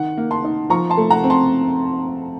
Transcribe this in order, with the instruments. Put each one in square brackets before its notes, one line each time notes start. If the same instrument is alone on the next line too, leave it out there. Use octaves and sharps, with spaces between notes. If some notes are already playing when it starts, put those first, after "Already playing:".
Already playing: [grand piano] D#3 F#5
A#3
A5 C6
D#4
F3 A#5 C#6
A5 C6
A3
F#5 A#5
C4
A5 C6